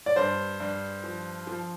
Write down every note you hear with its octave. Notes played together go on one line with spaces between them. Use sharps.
D5
G2 C5
G2
F3
F3